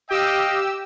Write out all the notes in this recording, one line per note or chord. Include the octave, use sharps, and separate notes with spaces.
G4 D#5 F5 G5 E6